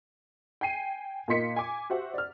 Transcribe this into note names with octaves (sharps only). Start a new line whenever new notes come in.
G5 G#5 C7 D#7
A#2 A#3 D#4 C6 B6 C#7
G#5 D6
F#4 G4 C5 E5 F#5
D5 F6